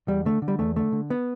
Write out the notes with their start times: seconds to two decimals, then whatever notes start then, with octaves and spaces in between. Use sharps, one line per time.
0.08 E2 G3
0.25 D3 A3
0.42 D3
0.48 G3
0.59 E2 A3
0.76 D3 A3
0.93 D3
1.10 B3